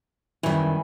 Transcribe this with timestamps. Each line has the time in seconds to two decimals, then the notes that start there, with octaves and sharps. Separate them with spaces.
0.43 F#2 D#3 E3 G3 G#4